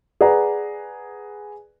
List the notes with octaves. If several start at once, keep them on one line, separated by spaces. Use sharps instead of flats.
G#4 B4 D5 F#5 A#5